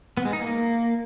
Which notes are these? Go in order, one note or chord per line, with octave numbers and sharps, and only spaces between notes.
B3
G#3
D#4
A#3